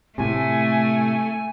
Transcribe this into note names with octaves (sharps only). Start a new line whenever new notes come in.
A2 C3 A3 G#5